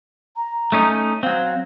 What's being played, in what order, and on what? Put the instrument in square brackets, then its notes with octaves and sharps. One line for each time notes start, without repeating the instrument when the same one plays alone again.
[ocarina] A#5
[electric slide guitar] A3 C#4 D#4
[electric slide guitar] F#3 C4 [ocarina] F5